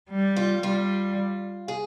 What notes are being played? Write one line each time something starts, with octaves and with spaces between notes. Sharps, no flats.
G3
F4
G3 F4
G#4